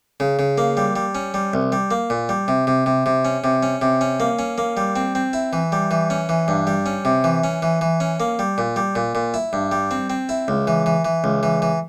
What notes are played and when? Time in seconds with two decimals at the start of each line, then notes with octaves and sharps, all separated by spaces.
0.20 C#3
0.39 C#3
0.58 A#3
0.77 G3
0.96 G3
1.15 C#4
1.34 G3
1.54 C2
1.72 G3
1.91 A#3
2.10 A#2
2.29 G3
2.48 C3
2.67 C3
2.86 C3
3.06 C3
3.25 C#4
3.44 C3
3.63 C#4
3.82 C3
4.01 C#4
4.20 A#3
4.39 C#4
4.58 A#3
4.77 G3
4.96 C4
5.15 C4
5.33 E4
5.53 E3
5.72 G3
5.91 E3
6.10 C#4
6.29 E3
6.48 G2
6.67 G3
6.86 C#4
7.05 C3
7.24 E3
7.44 C#4
7.62 E3
7.81 E3
8.00 C#4
8.20 A#3
8.39 G3
8.58 A#2
8.76 G3
8.95 A#2
9.15 A#2
9.34 E4
9.53 G2
9.72 G3
9.91 C4
10.10 C4
10.29 E4
10.48 C#2
10.67 E3
10.86 E3
11.05 E3
11.24 C#2
11.43 E3
11.62 E3